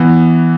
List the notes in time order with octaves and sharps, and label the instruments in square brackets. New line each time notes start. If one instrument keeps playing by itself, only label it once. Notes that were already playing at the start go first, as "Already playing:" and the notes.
Already playing: [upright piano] E3 B3